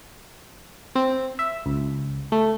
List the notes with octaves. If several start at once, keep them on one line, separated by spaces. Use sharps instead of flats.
C4
E5
C#2
A3